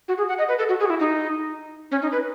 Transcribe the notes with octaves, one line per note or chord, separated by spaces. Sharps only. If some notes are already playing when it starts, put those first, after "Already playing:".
F#4
G#4
F#5
D#5
B4
A4
F#4
G#4
F#4
E4
D#4
C#4
D#4
B4